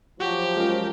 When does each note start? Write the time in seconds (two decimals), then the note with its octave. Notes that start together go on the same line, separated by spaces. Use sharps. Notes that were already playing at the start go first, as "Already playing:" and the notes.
0.20 F3 F#3 F#4 G4 D6
0.57 G#3 C#4 F4 A#4